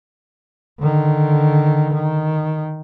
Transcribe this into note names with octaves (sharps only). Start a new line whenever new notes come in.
D3 D#3
D#3